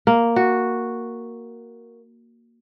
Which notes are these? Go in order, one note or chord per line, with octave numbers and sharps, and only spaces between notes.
A#3
F#4